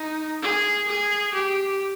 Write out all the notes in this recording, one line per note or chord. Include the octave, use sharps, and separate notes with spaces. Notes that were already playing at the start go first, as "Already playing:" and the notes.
Already playing: D#4
G#4
G#4
G4